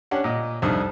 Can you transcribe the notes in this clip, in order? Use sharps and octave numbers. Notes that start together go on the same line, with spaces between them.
C#4 D4 G4 F#5
A#2 D#5
C2 F2 D4 D#4 D#6